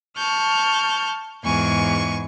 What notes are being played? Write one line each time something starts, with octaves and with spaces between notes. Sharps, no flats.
A5 C#6 F6 G6
E2 G#2 G#5 C#6